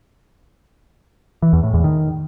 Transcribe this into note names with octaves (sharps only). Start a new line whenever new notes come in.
E3
E2
A2
E2
D#3